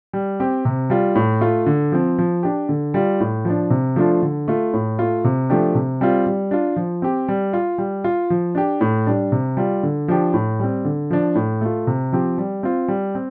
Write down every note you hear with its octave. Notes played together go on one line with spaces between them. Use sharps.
G3
C4 G4
C3
G3 F4
A2
A3 F4
D3
F3 C4
F3
D4 G4
D3
G3 F4
A2
F3 D4
C3
F3 A3 D4 F4
D3
A3 F4
A2
A3 F4
C3
F3 A3 D4 G4
C3
G3 C4 F4
G3
D4 F4
F3
C4 G4
G3
F4
G3
F4
F3
D4 G4
A2
G3 D4
C3
G3 F4
D3
F3 D4 G4
A2
G3 C4
D3
F3 D4
A2
A3 F4
C3
F3 C4 G4
G3
C4 F4
G3
C4